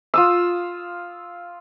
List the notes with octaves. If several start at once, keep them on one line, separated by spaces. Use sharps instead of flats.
F4 D#6 E6